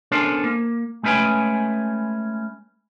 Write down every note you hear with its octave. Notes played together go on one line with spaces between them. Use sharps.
B3 C#4 D4 A4 A#4 C5
A#3
G#3 A3 C#4 B4 G5 G#5